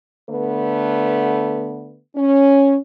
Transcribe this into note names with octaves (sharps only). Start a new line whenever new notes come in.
D3 A3 B3 B4
C#4